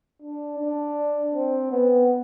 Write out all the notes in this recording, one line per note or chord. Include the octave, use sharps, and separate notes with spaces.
D4
D4
C4
B3